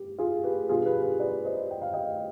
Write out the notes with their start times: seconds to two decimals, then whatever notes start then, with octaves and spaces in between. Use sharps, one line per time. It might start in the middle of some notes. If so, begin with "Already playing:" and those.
Already playing: G3 G4
0.19 F4 G#4
0.44 G4 B4
0.69 B2 G3 D4 F4 G#4
0.86 G4 B4
1.03 G4 B4
1.20 B4 D5
1.45 C5 D#5
1.71 G5
1.82 F5
1.93 D#5 G5